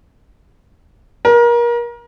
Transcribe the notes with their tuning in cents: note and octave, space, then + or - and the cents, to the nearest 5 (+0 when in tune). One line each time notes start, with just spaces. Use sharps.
A#4 +30